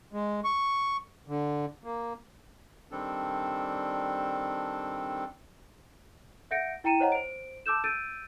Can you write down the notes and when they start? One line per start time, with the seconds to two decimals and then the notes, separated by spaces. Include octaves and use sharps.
0.13 G#3
0.44 C#6
1.28 D3
1.84 A#3
2.91 D#3 G3 C4 D4 A4
6.51 E5 F#5 G6 A#6 C#7 D7
6.84 E4 G5 A#5 C#7 D#7 E7
7.00 C5 C#5 D#5 F#5 A#5
7.12 C5 D7
7.66 A5 D6 E6 G6 E7
7.84 E6 G6 A6 D7 D#7